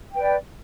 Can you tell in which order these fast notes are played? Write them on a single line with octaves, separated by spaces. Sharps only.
G5 B4 D5